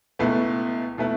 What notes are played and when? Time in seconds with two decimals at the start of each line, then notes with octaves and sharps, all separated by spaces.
0.19 C#2 B2 A3 E4 B4
0.98 B2 A3 E4 B4